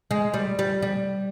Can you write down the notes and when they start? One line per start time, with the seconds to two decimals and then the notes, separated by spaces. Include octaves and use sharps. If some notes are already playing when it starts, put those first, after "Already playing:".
0.11 G#3
0.34 G3
0.59 G3
0.82 G3